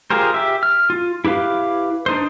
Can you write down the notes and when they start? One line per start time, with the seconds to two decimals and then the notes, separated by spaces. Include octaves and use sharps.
0.10 F4 G4 G#4 A#4 C5
0.34 G4 E5
0.63 F6
0.90 F4
1.25 E4 G4 B4 F5
2.06 D4 D#4 C5